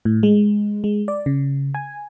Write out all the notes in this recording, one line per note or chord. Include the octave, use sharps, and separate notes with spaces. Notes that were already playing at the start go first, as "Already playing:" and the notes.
A2
G#3
G#3
D5
C#3
G#5